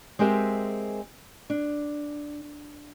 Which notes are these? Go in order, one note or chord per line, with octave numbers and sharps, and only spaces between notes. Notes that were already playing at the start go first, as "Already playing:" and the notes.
G#3 C4 G4 A#4 E5
D4